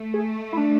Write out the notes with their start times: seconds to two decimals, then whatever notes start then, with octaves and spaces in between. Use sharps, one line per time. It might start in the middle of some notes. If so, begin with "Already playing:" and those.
Already playing: A3
0.14 G#4
0.53 E4
0.57 D4